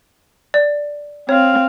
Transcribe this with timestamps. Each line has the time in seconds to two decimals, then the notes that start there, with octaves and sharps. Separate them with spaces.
0.54 D5
1.29 C4 C#5 F5